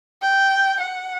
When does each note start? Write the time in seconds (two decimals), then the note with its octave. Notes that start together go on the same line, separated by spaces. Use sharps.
0.22 G5
0.80 F#5